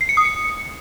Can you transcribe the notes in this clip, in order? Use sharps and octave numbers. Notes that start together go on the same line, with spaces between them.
C7
C#7
D#6
C#7